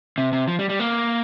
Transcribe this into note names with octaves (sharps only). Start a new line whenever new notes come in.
C3
C3
F3
G3
G3
A#3